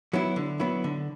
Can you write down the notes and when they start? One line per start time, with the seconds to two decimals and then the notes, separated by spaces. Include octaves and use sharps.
0.13 F#3 B3 E4
0.36 D3
0.60 F#3 B3 E4
0.84 D3